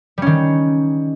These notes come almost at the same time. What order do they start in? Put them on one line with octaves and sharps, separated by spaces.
G3 C#4 D#3